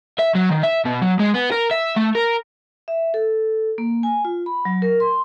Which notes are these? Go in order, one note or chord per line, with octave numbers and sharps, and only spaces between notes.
E5
F#3
D#3
E5
B2
F#3
G#3
B3
A#4
E5
A3
A#4
E5
A4
A#3
G#5
F4
B5
F#3
A#4
C6